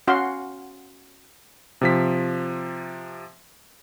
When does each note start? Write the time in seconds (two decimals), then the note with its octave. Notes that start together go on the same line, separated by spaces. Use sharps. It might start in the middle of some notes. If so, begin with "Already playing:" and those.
0.07 C#4 F#4 F5 F#5 C6
1.81 C3 F3 B6